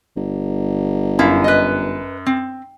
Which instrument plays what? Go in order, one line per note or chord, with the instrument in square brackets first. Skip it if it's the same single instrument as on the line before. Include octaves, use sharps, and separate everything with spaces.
[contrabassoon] G1
[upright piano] F#2 [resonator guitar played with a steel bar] E4 F5
[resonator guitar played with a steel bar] B4 D#5
C4